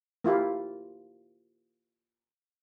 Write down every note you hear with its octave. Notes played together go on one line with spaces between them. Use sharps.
A#3 E4 F4 G4